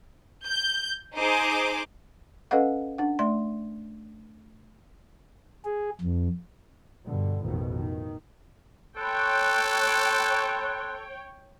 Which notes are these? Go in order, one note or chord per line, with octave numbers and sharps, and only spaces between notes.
G6
D#4 G#4 C5 C6 D6
C#4 A4 B4 D#5 F5 F#5
D4 F#5
A3 D5 C6
G#4
F2
G2 B2 D3
A1 F2 B2 D#3
D#3
A4 C#5 G5 B5 C6 F#6